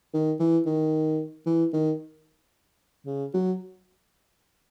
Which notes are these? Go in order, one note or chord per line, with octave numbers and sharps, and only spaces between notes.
D#3
E3
D#3
E3
D#3
C#3
F#3